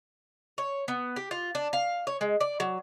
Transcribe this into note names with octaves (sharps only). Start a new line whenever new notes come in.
C#5
B3
G4
F4
D4
F5
C#5
G#3
D5
F#3